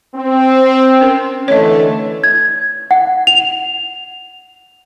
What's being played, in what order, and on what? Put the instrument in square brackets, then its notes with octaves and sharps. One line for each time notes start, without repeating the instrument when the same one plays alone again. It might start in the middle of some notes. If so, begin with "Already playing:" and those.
[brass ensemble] C4
[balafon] C#4 A#4
[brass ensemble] D3 E3 A3 [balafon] C#5 D#5
[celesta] G#6
F#5
F7